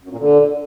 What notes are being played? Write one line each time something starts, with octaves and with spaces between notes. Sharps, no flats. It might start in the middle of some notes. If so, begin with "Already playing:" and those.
F#2
A#2
D3